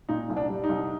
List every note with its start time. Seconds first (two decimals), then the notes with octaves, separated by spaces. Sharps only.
0.09 A#2 D#4
0.30 C2
0.37 D4
0.49 G3
0.64 D#4
0.69 C2